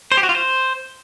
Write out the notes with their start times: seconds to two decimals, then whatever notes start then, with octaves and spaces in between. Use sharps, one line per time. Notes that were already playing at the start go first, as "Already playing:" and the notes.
0.12 C5
0.17 G4
0.23 F#4
0.29 F4
0.35 C5